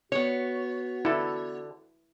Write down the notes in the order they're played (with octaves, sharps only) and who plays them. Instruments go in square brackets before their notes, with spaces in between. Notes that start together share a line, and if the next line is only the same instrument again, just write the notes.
[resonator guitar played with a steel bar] B3 C#5 [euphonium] F#4
[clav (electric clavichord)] D3 A4 [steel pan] E4